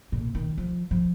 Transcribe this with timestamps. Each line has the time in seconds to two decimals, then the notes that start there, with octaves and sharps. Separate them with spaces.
0.12 A#2
0.35 D#3
0.58 F3
0.91 F3